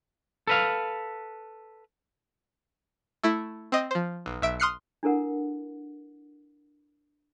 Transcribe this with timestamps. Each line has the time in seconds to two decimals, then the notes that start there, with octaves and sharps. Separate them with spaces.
0.47 A4 B4 F5
3.24 A3 E4
3.72 C4 D#5
3.91 F3 C5
4.26 B1
4.42 B1 E5 D7
4.60 C6 D#6 F6 F#6 C7 C#7
5.03 D4 E4 A4 A#4 F#5